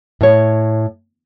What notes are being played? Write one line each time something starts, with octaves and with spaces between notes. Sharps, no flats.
A2 C#5